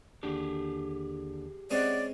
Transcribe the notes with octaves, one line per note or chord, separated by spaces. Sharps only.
D#2 D3 D4 G4 G#4
G#3 C4 C#4 D5 D#5 F#5